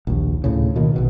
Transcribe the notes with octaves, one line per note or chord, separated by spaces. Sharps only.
A#1 D#2
D2 A2 C#3
B2 D#3 A#3
A#1 B2 D#3